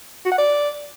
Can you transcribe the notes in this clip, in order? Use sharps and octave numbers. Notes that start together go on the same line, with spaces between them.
F#4
F#5
D5